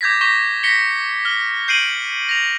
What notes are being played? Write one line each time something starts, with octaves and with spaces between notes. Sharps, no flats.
D6 G6 G#6 A#6 B6
C#6 G6 A#6 B6 G7
A#6 B6 C#7 G7
F6 G7
G6 C7 D7 D#7 F#7
A#6 F7